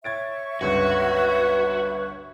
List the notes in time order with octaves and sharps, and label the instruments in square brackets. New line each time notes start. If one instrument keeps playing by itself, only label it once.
[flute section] C#5 E5 C#6 [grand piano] G#6 A6 D7
[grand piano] G1 C#2 G2 [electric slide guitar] F#4 [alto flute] B4